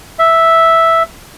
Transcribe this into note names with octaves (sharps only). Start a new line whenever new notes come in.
E5